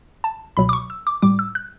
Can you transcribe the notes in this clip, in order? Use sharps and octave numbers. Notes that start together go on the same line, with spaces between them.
A5
C#2 B2 F#3 B5
D6
C#6
E6
D6
A2 G3 D6
E6
F#6